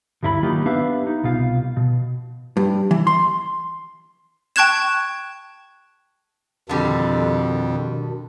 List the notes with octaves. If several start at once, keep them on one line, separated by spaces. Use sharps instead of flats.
D2 G2 E4 G#4 B5
D#3 F#3 A#3 D#4 F4 G4
B3 D4 G4 B4 E5 F5
D#4
C2 B2 F4 F5
B2
G2
E3
C6
G5 A5 C#6 F#6 G#6 E7
F2 B2 D3 D#3 G3 D4 G4